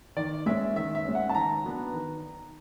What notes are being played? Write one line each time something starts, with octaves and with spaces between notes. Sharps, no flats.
D#3 D5
G#3 C#4 E5
D#3 E5
E5
G#3 C#4
F#5
A5
D#3 A#5
F#3 B3 D4
D#3